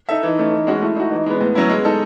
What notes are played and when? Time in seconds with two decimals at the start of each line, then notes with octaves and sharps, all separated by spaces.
0.09 D#4 A4 E5
0.23 E3 D#4
0.39 A3 C#4
0.52 E3
0.67 G#3 C#4 F#4
0.82 A3 E4
0.96 D#4 F#4
1.11 E3 D#4
1.26 G#3 B3
1.41 A2 B3
1.55 F#3 C#4 E4
1.69 G#3
1.85 D#4 A4